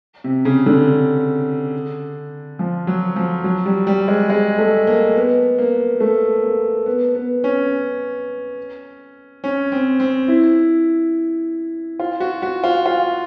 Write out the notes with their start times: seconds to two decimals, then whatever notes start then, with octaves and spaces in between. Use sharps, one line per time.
0.24 C3
0.45 C#3
0.66 D3
2.59 F3
2.87 F#3
3.16 F3
3.44 F#3
3.66 G3
3.87 G3
4.08 G#3
4.30 G#3
4.58 A3
4.87 A#3
5.16 B3
5.58 A#3
6.00 A3
6.43 A#3
6.86 B3
7.15 B3
7.44 C#4
9.44 C#4
9.72 C4
10.00 C4
10.28 E4
12.00 F4
12.20 F#4
12.42 F#4
12.64 F4
12.86 F4